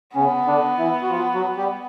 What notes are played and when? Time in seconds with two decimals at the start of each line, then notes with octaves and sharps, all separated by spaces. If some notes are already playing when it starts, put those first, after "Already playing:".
0.15 C#3 B3 C#4
0.47 D3 D4
0.79 E3 E4
1.02 F#4
1.10 F3 F4
1.35 F#3 F#4
1.57 G3 G4